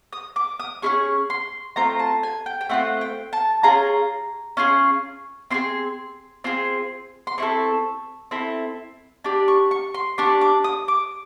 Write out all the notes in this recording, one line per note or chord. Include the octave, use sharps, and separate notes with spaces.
D#6
D6
D#6
C#4 E4 G#4 C#6
C6
A3 C4 F4 A#5
A5
G#5
G5
G5
A3 C4 F4 F#5
G5
A5
C#4 F4 G#4 A#5
C#4 F4 G#4
C4 F4 G#4 C6
C4 F4 G#4
C6
C4 E4 A4 C#6
C4 E4 A4
D4 G4
C#6
C#6
C6
D4 G4 C#6
D6
D#6
D6